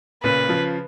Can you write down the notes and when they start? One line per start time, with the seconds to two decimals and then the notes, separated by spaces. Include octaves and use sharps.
0.23 A#2 C#3 B4
0.49 C#3 F3